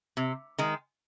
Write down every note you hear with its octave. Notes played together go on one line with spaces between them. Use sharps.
C3
D#3 G#3